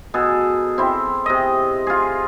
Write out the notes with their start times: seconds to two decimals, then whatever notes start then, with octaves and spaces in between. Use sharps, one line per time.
0.14 B2 G#4 A4
0.78 C4 E4
1.26 C3 D#5
1.87 F4 G#4